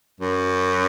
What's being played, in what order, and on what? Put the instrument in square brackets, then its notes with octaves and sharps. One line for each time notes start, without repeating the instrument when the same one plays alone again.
[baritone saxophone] F#2